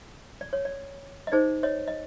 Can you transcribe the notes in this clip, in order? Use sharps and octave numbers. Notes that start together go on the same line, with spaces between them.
D5
C#5
D5
D#5
D#4 G#4 C5 D5
C#5 D#5
D#5